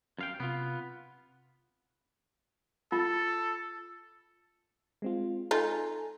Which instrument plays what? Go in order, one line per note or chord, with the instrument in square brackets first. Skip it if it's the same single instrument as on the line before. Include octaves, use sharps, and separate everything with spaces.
[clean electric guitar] F#2 F5 G5
[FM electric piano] C3 [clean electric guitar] B3 F4
[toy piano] F4 [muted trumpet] A4
[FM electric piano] G#3 C4 F4
[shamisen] D#4 F4 [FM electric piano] A4 G#5 A#5